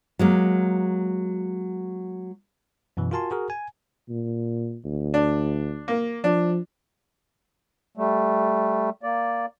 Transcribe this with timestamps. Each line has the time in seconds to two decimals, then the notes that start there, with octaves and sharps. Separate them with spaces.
0.19 F#3 G#3 A#3
2.97 F#2 B2 E3
3.11 F4 F#4 A#4 G#5 A5 C6
3.31 F#4 G#4 A#4
3.50 G#5
4.09 A#2
4.85 D2
5.14 D4
5.88 A#3
6.24 F3 D4
7.97 G3 A3
9.03 A#3 D5